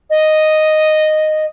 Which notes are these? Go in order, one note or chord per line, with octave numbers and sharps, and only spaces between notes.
D#5